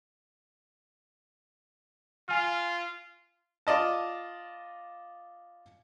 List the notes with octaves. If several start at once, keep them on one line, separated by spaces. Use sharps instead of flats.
F4 G#5 F6
F4 D5 D#5 A5